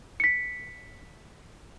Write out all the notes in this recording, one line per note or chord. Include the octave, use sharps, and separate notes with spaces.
B6 C#7